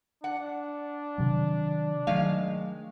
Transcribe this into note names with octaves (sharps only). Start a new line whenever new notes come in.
D4 F#5
C3 D#3 F#3
D#3 F#3 G#3 A3 F5